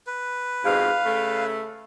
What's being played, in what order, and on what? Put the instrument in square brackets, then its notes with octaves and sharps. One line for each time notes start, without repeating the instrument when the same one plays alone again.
[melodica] B4
[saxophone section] F2 G#2 B2 [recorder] F5
[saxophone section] C#3 A3